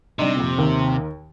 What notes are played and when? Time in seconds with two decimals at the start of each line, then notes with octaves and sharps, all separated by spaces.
0.19 C3 G3 D4 D#4
0.37 F2 A#2
0.58 D#2 A#4